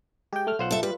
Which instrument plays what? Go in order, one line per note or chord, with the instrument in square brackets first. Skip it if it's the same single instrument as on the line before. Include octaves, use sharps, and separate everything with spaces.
[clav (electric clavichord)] G#3 [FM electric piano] G4 G5
[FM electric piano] A3 F6
[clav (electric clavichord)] B1 C5 F#5 [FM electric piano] F4
[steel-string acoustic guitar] A4 E5
[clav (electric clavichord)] G3 [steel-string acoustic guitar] B4